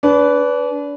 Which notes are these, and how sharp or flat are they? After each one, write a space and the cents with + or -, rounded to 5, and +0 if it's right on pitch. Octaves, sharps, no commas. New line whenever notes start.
D4 -35 B4 +0